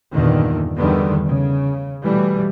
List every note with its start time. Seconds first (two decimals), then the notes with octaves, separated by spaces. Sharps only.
0.12 E2 G2 A#2 D3 D#3
0.76 E2 D3 D#3 G3 A3 B3
1.27 C#3
2.03 B2 E3 G3 A3